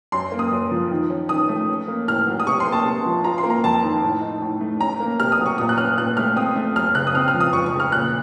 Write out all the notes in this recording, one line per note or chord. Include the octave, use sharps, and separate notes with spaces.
F#2 C6
A#3
D#6
F#2
F3
D#3
C#4
D#3 D#6
A3
C#4
A#3
A2 F6
F#3
D#6
C3 C#6
C6
A#3
A5
C3
F3
F4 A#5
C6
A#3
A#5
F2 A5
D#3
A2
D#4
A2
A3
C#4 A#5
A#3
C3 F6
D#6
F#3
C#6
A#2 D#6
F#6
C#4 F6
A#2 F#6
A3 F6
C4 D#6
A3
F#2 F6
C#3 F#6
D#6
C4 F6
F6
F3
D#6
F2 C#6
C#6
C#3
F6
A#2 F#6